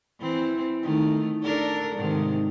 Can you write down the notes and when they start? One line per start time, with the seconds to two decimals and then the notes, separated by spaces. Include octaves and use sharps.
0.20 E3 C4
0.83 D#3 A3
1.42 D4 A4 A#4
1.95 G#2 C3 D#3